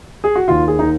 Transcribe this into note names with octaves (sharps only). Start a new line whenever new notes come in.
G#4
F#4
D#2 D#3 F4
G#4
D#4